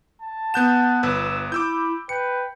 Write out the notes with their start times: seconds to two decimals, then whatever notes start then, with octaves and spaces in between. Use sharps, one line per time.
0.21 A5
0.54 B3 F#5 G6 E7
1.03 G1 B4 E6
1.52 E4 B5 D6 E6 G6
2.09 B4 G5 C#7